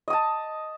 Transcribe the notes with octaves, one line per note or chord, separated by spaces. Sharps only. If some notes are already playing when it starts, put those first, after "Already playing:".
D#5 A5 D#6